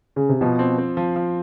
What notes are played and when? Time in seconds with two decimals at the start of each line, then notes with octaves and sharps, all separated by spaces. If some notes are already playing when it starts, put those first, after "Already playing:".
0.16 C#3
0.29 C3
0.41 B2 F3
0.59 C4
0.78 C4
0.97 F3
1.16 F3